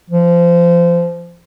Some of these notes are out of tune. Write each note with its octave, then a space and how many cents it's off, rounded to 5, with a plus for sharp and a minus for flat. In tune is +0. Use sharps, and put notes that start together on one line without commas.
F3 -25